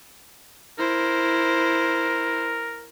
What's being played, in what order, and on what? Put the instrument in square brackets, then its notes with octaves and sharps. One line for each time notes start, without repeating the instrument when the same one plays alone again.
[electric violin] E4 C5 [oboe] A#4